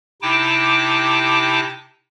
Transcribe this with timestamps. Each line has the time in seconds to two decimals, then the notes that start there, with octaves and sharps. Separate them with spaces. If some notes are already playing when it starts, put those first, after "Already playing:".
0.22 C3 D#4 E4 G5 A5 D6